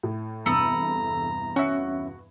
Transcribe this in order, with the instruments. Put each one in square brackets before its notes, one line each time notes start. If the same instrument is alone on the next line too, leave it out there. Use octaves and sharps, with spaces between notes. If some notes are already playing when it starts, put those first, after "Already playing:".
[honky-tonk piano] A2
[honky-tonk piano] E2 G2 C3 [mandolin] A4 B5 D#6 [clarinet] A#5
[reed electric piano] C#4 E5 [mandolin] F#4